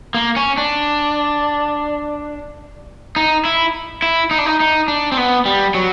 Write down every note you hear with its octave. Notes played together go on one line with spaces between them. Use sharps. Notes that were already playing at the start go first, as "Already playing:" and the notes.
A#3
C#4
D4
D#4
E4
E4
D#4
D4
D#4
D#4
D4
C4
B3
G3
F#3